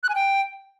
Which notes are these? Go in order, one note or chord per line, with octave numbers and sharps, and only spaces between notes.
F#6
G#5
G5